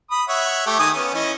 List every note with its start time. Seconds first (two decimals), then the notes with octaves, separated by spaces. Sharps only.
0.11 B5 D#6
0.28 C#5 E5 F#5
0.66 A3 G4
0.79 D#3 G#5 D#6
0.96 B3 C#4
1.14 E3 C#4 D#5